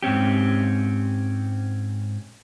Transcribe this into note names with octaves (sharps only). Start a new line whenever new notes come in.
G#2 C4 C#4 G4